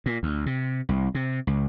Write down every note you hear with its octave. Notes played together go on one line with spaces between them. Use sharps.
A#2
D2
C3
C2
C3
C#2